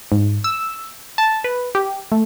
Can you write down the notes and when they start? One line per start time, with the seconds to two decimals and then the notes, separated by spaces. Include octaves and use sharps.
0.12 G#2
0.44 E6
1.18 A5
1.44 B4
1.75 G4
2.12 A3